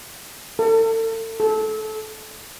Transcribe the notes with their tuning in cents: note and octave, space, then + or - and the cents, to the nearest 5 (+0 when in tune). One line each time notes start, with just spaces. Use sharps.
A4 +35
A4 -25